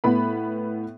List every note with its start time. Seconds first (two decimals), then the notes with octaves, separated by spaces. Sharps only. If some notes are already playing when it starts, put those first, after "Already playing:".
0.04 A2 B3 B5